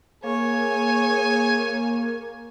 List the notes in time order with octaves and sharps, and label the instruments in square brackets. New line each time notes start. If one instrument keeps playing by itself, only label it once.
[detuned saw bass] A#3 [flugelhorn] G#4 [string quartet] C#5 [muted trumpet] G#5